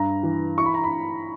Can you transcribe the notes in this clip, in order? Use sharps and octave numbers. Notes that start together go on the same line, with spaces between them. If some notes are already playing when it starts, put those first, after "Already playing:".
Already playing: G2 A#5
E3
E4 C#6
B5
A#5
B5